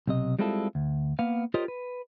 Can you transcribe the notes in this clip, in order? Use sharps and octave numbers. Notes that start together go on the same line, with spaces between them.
B1 C3 D#5
G3 G#3 C4 E4 F4 A4
D2
A#3 B3 F5
F4 G4 A#4 C5 C#5 D#5
B4